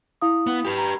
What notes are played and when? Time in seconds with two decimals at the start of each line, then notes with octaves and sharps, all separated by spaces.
0.22 E4 F5 D#6
0.47 B3
0.65 G4 B4
0.78 A#5